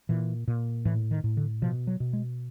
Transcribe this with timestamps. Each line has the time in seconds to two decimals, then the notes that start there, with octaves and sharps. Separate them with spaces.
0.09 A#2 E3
0.48 A#2
0.85 A2 E3
1.11 D#3
1.24 A2
1.37 D3
1.62 B2 F3
1.87 F#3
2.00 B2
2.13 G#3